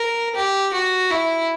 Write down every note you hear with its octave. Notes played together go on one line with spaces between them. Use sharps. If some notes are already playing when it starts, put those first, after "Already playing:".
Already playing: A#4
G4
F#4
E4